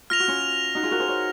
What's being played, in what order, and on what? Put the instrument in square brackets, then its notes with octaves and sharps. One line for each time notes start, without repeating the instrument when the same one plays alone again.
[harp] F4 [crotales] F6 A#6 F7
[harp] F#4
C#4 F4
D#4 F#4
F4 G#4
F#4 A#4
G#4 C5
A#4 C#5